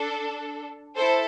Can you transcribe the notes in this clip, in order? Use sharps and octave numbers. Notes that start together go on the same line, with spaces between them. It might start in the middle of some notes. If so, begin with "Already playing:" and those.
Already playing: D4 A4
E4 A4 C5